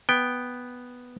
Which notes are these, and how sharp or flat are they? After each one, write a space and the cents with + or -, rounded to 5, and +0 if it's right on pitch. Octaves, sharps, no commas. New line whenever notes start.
B3 +0 G5 +5